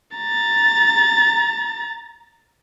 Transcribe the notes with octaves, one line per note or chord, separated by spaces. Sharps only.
A#5 A6